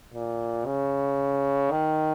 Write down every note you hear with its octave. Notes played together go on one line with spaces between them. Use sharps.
A#2
C#3
D#3